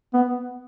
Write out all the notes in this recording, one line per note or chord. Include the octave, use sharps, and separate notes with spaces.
B3